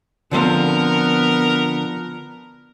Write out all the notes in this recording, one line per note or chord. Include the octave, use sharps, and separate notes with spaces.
D3 F3 B3 C4 A#4